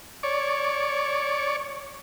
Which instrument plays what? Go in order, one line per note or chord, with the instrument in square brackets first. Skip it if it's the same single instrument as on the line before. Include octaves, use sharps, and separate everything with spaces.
[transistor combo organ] C#5 D5